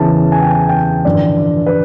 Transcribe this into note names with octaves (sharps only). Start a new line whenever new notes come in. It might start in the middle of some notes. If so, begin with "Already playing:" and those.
Already playing: E2 C#3 E3 A5
G#5
G5
G#5
G5
A1 G2 D3 F3 D5
B4